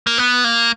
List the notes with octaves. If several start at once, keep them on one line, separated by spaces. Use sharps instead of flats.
A#3
B3
A#3